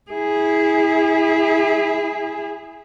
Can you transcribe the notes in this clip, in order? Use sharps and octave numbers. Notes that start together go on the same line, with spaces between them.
E4 G#4